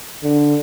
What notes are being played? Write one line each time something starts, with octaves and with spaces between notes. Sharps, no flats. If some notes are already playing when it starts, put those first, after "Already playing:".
D3